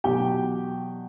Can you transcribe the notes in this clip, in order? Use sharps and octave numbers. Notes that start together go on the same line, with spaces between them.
E2 B2 F#3 G4 G5